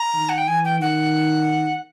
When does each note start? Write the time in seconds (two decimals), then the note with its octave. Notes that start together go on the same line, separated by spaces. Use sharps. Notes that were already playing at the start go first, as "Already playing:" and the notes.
Already playing: A#5
0.14 D#3
0.29 F#5
0.38 G5
0.48 E3 G#5
0.65 G5
0.80 D#3 F#5